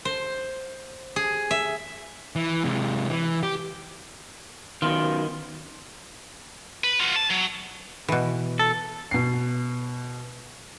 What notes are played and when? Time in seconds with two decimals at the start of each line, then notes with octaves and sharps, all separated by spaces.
0.05 C5
1.16 G#4
1.51 E5
2.36 E3
2.64 C3 G#3
3.10 E3
3.43 G4
4.82 F#2 B2 D#3 F4
6.84 B4
7.00 F4 F#4
7.16 A5
7.30 F#3
8.08 B2 E3
8.59 A4
9.11 B2 C7